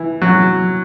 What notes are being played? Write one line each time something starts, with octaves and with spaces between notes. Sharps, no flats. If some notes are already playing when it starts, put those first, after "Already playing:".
Already playing: E3
F#3